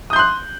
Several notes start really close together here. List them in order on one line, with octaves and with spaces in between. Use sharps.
D#6 G6 C6 F#6